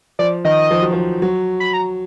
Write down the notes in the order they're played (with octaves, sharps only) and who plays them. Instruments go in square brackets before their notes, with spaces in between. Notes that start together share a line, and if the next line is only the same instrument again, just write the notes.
[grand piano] F3 [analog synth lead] D5
[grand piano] D#3 [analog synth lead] D#5
[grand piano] F3
F#3
F3
F#3
[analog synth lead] B5
A#5